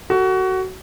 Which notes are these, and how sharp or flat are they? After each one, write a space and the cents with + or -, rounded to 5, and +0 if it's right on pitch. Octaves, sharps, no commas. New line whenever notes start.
F#4 +20 A4 +25